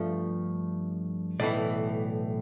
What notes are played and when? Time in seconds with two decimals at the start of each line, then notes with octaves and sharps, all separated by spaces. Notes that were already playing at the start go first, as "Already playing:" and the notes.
Already playing: G2 F3 A3 E5
1.39 B1 A2 E3 D5